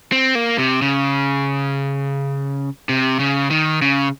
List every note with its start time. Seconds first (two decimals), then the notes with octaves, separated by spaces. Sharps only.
0.12 C4
0.35 A#3
0.58 C3
0.82 C#3
2.89 C3
3.20 C#3
3.51 D#3
3.82 C#3